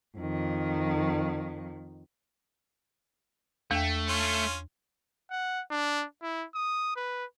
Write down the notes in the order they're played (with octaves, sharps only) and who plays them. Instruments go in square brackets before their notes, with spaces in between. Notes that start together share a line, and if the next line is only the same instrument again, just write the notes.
[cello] F2 D#3
[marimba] E2 G5 [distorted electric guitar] A3
[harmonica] C#4 F4 C6
[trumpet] F#5
D4
E4
D#6
B4